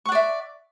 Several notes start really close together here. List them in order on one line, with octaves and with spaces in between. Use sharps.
C#6 F#5 D5 E5